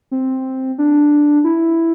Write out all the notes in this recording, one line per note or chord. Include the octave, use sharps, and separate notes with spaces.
C4
D4
E4